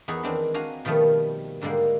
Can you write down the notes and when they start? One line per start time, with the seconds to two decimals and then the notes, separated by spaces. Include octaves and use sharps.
0.08 E2 B3 D#4 G#4 B4 C#5
0.23 D#3 E3 G#3 C4 D4
0.54 D4 F#4 F5 G#5 A#5
0.85 B2 D#3 F3 G3 A3
1.62 G#2 D3 G3 G#3 A#3